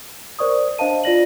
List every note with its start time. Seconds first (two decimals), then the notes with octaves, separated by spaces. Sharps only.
0.39 A#4 C5 D5 C#6 D#6
0.78 D4 C5 D#5 F5 A5 D#7
1.04 F4 D5 A#6 F#7